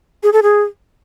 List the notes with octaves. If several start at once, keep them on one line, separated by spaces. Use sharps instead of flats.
G#4
A4
G#4